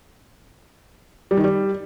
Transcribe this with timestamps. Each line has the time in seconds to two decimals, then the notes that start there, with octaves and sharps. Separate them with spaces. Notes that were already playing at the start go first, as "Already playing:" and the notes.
1.31 G3
1.37 D#3
1.44 G3